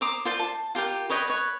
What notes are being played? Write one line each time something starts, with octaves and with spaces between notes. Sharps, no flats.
C5 A#5 D6 D#6
F4 C5 D5
A5
F4 G4 A#4 G5
B4 C#5 D#5 G5
B4 C#5